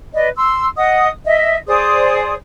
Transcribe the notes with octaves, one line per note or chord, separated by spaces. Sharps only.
B4 D5 D#5
C6 E6
D#5 F#5 D#6
D#5 E5
G#4 C5 D5 D#6